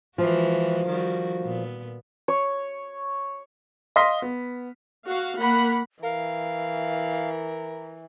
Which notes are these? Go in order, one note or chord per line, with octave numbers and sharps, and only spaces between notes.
E3 F3 G#3 F#4
D#3 G3 F#4
A#2 B3
C#5
D#5 F5 C6 D#6 B6
B3
F#4 F5
A#3 F#5 B5
E3 A#4 F5